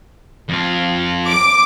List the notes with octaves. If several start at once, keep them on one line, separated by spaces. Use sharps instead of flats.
F2 F4
D6